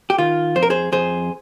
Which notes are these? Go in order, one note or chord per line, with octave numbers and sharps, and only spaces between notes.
G4
D#3 F4
F2 C5
A#4
G#4 C5
F2 G#4 C5